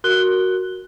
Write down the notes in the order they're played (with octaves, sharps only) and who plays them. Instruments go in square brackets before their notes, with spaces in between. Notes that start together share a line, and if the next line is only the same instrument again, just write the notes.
[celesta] F#4 A#4 F#6 G7